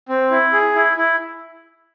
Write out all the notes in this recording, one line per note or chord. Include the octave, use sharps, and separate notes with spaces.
C4
E4
G#4
E4
E4